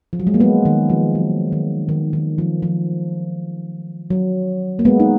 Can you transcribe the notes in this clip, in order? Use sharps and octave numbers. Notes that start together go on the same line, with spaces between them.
F3
F#3
G#3
A#3
G#3 B3
D#3
F3
F#3
D#3
D#3
D#3
F3
F3
F#3
A#3
G#3 B3
D#4